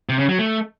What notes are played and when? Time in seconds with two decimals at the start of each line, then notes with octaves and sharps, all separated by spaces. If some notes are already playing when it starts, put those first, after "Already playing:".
0.09 C3
0.19 C#3
0.29 F#3
0.39 A3